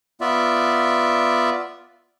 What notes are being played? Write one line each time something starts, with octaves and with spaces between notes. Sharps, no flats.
B3 F4 D5 E5